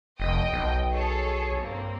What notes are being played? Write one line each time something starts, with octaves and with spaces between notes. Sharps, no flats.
F1 D#5 G5
B1
G#4 A4 C#5
G2 A#3 C4